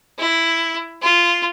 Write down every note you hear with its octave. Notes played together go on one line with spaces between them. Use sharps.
E4
F4